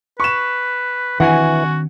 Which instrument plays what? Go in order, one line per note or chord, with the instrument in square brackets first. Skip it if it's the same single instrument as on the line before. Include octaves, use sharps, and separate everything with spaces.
[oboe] B4 [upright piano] C#6 E7
[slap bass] D#3 C4 D4 [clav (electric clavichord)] E3 [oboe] F#4 [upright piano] F#5 G#5